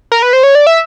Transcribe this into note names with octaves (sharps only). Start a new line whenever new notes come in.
A#4
B4
C5
C#5
D5
E5